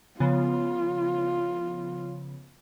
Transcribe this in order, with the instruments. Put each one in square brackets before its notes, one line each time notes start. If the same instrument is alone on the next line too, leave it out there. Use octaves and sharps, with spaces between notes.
[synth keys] C#3 F3 B3 [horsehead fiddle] F4